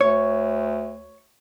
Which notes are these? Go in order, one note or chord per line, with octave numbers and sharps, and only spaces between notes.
D2 C#5